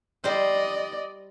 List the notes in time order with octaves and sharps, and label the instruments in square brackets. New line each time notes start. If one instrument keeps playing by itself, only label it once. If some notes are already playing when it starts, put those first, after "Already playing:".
[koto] G3 C5 [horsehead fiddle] D5 D#5